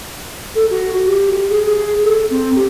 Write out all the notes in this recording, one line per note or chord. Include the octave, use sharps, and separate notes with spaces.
A4
F#4
G4
G#4
G#4
A4
C4
G4